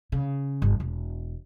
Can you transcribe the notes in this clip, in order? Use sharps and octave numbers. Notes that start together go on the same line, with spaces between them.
C#3
G1
E1